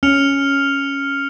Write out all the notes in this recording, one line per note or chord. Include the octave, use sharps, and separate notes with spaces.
C#4 F6 C#7 F7